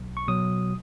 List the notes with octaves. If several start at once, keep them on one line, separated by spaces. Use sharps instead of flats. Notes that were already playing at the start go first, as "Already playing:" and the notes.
Already playing: B1
C#6
B2 F#3 D#6